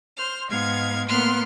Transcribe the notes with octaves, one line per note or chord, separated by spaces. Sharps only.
C5 F6
G#2 G#3 B3 F5 G#6
A2 A#3 B3 C6 F6 F#6